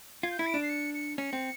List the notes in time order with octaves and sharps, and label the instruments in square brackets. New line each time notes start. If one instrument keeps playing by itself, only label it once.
[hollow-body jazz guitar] F4 [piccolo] G#6
[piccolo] G6
[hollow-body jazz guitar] E4 [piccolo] G#6
[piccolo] D7
[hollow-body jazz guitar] D4
[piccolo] C7
C#7
C#7
[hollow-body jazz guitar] C#4 [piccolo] C#7
[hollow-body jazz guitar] C4